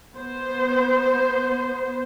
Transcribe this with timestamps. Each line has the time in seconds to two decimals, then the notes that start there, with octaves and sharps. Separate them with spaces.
0.15 B3 C5